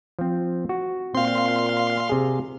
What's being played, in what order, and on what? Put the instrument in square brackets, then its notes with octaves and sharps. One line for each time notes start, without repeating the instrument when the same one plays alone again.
[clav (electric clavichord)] F3 C4
F#4
[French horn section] A#2 [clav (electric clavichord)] C4 [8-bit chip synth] F5 C6
[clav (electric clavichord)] C3 G#4